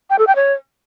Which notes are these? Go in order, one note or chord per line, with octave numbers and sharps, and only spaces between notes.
G5
A4
G5
C#5